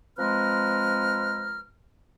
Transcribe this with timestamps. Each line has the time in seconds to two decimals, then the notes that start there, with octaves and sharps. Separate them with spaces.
0.19 F3 G#3 C4 B4 A#5 F6